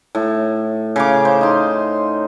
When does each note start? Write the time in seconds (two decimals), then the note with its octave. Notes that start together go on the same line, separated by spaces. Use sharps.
0.15 A2
0.96 C#3 F5 D6
1.25 C5
1.41 D#4 C6